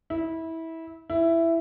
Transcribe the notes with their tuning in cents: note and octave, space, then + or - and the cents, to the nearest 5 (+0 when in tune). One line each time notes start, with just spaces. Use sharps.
E4 -20
E4 +10